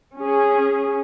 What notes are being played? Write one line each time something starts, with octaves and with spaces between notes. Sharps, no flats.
C#4 G#4